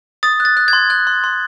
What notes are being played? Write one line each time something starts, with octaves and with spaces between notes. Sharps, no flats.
D#6 A6
F#6
A6
F#6
C6 G#6
F#6
C6
C6